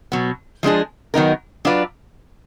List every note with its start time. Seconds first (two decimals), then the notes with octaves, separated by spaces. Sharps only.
0.12 B2 F#3 B3
0.63 F3 G#3 D4 G#4
1.14 D#3 F#3 B3 D#4 A#4
1.65 F#3 D4 F4 B4 D5